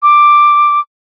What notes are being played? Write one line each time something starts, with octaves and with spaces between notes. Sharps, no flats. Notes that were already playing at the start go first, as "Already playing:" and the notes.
D6